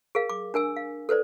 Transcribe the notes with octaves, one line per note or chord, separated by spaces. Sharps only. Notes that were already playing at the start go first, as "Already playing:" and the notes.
G#4 A#4 F5
D6
D4 A#4 G#5 E6
F5
A4 B4 C5 D5